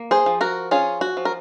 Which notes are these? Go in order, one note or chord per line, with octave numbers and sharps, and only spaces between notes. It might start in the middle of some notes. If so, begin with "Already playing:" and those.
Already playing: A#3
G#4 C5
F3
F#4 A#4
C#4 F4 G#4
F#4
F3
A#4